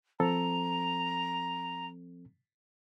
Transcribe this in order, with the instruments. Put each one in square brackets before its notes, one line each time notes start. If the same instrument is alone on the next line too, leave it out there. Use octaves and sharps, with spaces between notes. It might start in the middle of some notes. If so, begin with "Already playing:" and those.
[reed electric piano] F3 C4 A4 [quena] A#5